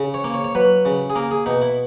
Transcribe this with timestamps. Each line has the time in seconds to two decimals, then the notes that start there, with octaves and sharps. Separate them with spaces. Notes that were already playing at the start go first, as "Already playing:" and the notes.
Already playing: C#3
0.14 C#5
0.24 A#3
0.34 C#5
0.44 C#5
0.55 F#3 B4
0.85 C#3
1.10 G#4
1.16 A#3 A#4
1.31 G#4
1.46 B2 D#4
1.62 E4